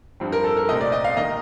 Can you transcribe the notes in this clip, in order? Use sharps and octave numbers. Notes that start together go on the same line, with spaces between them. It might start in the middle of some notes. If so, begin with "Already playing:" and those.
G2 F3 C4
A#4
A4
A#4
C2 A#2 A3 C4 D#5
D5
D#5
F5
D#3 A#3 D#5